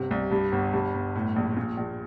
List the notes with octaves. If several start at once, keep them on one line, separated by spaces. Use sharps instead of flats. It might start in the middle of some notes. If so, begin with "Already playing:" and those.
Already playing: G1 C3
C2
G2
G1
G2
G1
A2
A#1
A#2
A#1